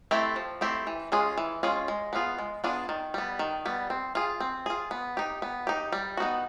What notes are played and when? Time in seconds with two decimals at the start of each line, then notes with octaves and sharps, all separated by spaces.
0.11 A3 C4 E4 G4
0.36 F3
0.61 A3 C4 E4 G4
0.87 E3
1.12 G#3 C#4 F4 G#4
1.38 E3
1.63 G#3 C#4 F4 G#4
1.88 G#3
2.13 B3 D4 F4 G#4
2.38 G#3
2.64 B3 D4 F4 G#4
2.89 D#3
3.14 G3 B3
3.39 D#3
3.65 G3 B3
3.90 C4
4.15 F4 G#4
4.40 C4
4.66 F4 G#4
4.91 B3
5.17 D#4 G4
5.42 B3
5.67 D#4 G4
5.92 G3
6.17 B3 D#4 F#4